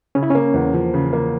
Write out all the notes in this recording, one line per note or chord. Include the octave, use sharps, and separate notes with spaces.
C#3 C#4
E4
A#3 C#4
E2
F3
C#3
A#3